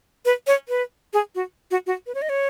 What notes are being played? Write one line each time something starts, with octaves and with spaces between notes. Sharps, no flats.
B4
C#5
B4
G#4
F#4
F#4
F#4
B4
C#5
D#5
C#5